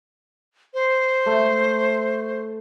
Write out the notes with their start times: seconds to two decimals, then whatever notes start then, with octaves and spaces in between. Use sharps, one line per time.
0.74 C5
1.26 A3